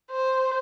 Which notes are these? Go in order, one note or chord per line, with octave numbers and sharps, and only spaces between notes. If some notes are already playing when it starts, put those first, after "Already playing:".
C5